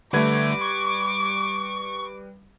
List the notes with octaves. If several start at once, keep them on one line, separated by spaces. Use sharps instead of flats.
D3 G3 A3 B4 D6 G#6
C#6